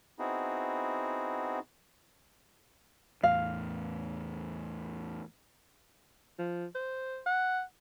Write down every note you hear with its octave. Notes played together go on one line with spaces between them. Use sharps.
B3 C4 D#4 E4 F#4 G#4
E2 A2 F5
F3
C5
F#5